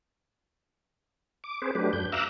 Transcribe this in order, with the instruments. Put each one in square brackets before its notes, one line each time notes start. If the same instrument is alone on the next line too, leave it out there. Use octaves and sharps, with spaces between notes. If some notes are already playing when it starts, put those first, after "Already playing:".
[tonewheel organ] D6
C4 G#4 B4 C5
F#3 A3 D4 G4 B4
F#2 G6
E5 F5 A#5 D6 E6 F#6